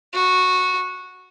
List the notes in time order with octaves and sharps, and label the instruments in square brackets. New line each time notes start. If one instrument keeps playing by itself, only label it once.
[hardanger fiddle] F#4